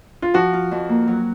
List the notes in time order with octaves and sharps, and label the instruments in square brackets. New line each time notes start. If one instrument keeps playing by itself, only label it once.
[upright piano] F4
[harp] F3 [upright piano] F#4
[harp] F4
F2
A#3
F#3